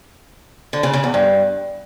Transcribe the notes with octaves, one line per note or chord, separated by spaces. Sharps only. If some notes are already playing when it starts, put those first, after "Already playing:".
D3
C#3
C#3
E2
G2